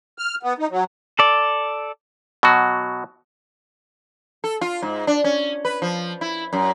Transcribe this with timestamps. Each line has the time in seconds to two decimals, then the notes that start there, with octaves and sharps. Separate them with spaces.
0.18 F6
0.43 B3
0.58 D#4
0.71 F#3
1.19 A4 D5
2.43 B2 F#3 F#4
4.44 A4
4.61 F4
4.82 G#2
5.07 D4
5.24 C#4
5.65 B4
5.82 F3
6.21 E4
6.53 F#2